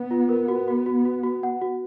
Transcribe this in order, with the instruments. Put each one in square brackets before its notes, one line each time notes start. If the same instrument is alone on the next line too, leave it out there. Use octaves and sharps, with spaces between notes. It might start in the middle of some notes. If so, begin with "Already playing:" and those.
Already playing: [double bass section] B3
[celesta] F4
A#4
F#4
F#4
F#4
F#4
F#4
F#5
F#4